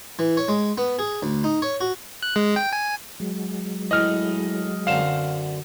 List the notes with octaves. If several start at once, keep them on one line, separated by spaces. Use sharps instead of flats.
E3
C#5
G#3
B3
G#4
D2
D#4
C#5
F#4
F#6
G#3
G5
G#5
F#3 G#3
A2 E3 D#5 F6
F#2 D3 C4 F5 E7